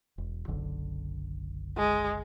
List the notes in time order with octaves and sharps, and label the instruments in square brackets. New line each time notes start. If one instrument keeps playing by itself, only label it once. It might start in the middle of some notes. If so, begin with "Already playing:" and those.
[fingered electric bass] E1
F#1 B1 D3
[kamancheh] G#3